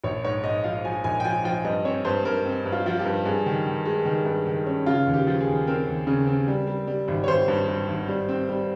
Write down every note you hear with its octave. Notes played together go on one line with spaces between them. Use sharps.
A#1 C#5
G#2 C#5
G#2 D#5
F3 F5
F3 G#5
A#1 G#5
G5
F3 G#5
F3 G5
G2 D#5
C4 C#5
G2 C5
G2 A#4
C4
G2
F4
F3 F4
G4
G2
G2 G#4
D#3
D#3
G#3
D#3
G2
D#3
C#4
C#3 F4
D#2
G4
F3
G#4
D#2
C4 A#4
D#2
C#3
C4
G3
G3
G3
G#1
C#5
G#1 C5
G2
G2
G#1
G3
C4
G3